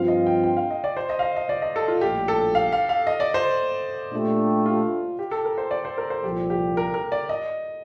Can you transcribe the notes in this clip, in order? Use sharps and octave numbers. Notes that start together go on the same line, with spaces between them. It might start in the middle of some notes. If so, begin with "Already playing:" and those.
Already playing: G2 F3 C4 F4 F5
D#5
G5
G5
F5
D#5
D5
C5
D#5
F5
D#5
D#5
D5
D#5
A4
F4
A#1 A2 G3 A#3 G4
A4
F5
F5
F5
D#5
D5
C5
A#2 A3 D4 G4
F4
G4
A4
A#4
C5
D5
C5
A#4
C5
C2 A#2 F3 G4
G4
A#4
A#4
D5
D#5